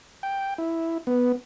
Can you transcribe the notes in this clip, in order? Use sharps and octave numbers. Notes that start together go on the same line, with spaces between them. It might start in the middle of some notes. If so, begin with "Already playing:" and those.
G5
E4
B3